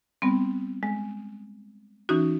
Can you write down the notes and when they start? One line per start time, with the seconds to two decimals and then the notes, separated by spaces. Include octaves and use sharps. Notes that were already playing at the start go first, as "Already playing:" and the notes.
0.22 G3 B3 C4
0.83 G#3
2.09 E3 C#4 D#4 F#4